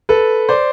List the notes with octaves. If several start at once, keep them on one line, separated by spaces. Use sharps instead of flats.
A4 B4
C5 D5